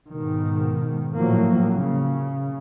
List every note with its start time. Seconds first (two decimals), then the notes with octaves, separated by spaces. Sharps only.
0.12 G#2 B2 D#3
1.18 A2 F3 F#3 A#3
1.76 C#3